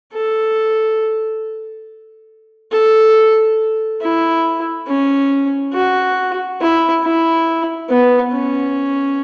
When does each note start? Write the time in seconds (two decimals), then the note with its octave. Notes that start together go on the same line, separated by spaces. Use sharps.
0.13 A4
2.72 A4
4.01 E4
4.88 C#4
5.73 F#4
6.61 E4
7.03 E4
7.89 B3
8.32 C#4